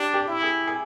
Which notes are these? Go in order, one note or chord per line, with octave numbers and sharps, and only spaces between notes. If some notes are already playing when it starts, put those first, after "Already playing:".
Already playing: D4 G4
G4
E4
G#4
G#4